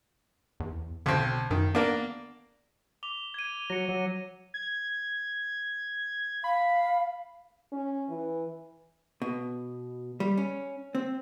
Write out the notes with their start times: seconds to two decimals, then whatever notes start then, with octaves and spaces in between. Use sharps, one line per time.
0.60 E2
1.06 B1 D3 C4
1.51 F#2 D#3
1.75 A#3 B3 D4
3.03 D6 F7 G7
3.34 G#6 D#7
3.70 F#3 A#6 C#7
3.89 F#3
4.54 G#6
6.44 F5 B5
7.72 C#4
8.09 E3
9.22 B2
10.20 G3
10.37 C#4
10.95 C4